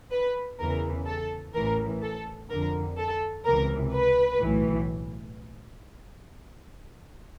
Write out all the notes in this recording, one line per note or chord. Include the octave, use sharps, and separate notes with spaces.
B4
E2 C#3 E3 A#4
A4
A1 A2 E3 A#4
A4
F2 D3 A#4
A4
C#2 C3 E3 A#4
B4
B1 A2 E3